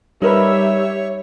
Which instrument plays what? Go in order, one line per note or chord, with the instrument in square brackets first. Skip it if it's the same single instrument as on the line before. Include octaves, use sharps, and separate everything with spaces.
[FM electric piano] G3 [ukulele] D#4 A#4 B4 [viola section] G4 E5 [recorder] C#5